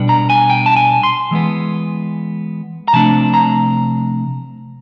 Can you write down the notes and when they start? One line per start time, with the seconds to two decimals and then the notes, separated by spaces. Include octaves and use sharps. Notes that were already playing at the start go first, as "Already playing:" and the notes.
Already playing: B2 G3 B3 D4
0.09 A#5
0.30 G#5
0.50 G5
0.66 A5
0.77 G#5
1.03 C6
1.31 E3 G#3 B3
2.88 A#5
2.93 C3 F3 A3 D4 A5
3.34 A#5